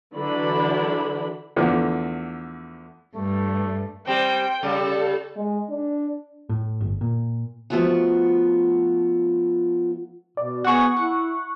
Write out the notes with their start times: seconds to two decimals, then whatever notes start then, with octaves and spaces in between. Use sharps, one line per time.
0.16 D3 E3 F#3 D4 B5
1.56 E2 D3 F3 A3
3.16 G2 A3
4.07 G3 C4 G5
4.63 C#3 G3 A4
5.36 G#3
5.69 D4
6.49 A2
6.80 G1
7.01 A#2
7.70 F3 G3 A3 B3 F4 F#4
10.37 B2 D5
10.64 B3 F#4 G#4 C#6 F#6
10.96 E4 F#5